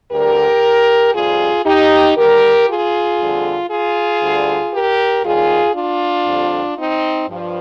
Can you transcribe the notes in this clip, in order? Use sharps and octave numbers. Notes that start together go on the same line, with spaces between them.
D2 D3 G3 G4 A#4
F2 C3 D#3 G3 F4 G#4
D#4 G4
D2 D3 G3 G4 A#4
F4 G#4
F2 D3 G3
F4 G#4
D2 D3 G3
G4 A#4
D#2 D#3 G3 F4 G#4
D4 F4
F2 D3 G3
C4 D#4
G2 F3